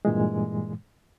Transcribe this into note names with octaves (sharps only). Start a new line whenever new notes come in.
G2 A#2 E3 G#3